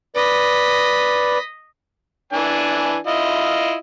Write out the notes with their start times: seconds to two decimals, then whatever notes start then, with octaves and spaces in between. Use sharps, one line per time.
0.16 B4 D5 D#5 B6
2.33 E3 D4 G#5
3.07 E4 F4 D#5